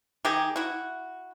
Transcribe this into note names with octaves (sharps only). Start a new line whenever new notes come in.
D#3 G4 G#4
E4 F#4